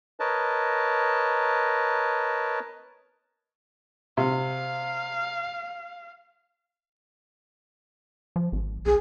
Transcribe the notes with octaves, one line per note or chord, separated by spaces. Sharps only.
A#4 B4 C#5 D#5 A5
C3 F5
F3
G#1
B1 G#4